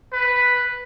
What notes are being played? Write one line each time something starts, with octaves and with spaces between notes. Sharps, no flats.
B4